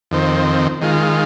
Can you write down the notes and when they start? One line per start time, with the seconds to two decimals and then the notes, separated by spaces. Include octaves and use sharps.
0.11 F2 D#3 C4
0.81 D#3 G#3 F4